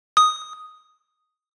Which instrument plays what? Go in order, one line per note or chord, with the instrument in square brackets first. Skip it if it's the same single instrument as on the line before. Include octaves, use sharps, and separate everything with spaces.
[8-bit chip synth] D#6